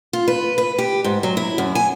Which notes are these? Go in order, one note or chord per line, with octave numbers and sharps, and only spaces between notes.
F4
B4
B4
G4
G#2
F#3
E4
F#2
G#5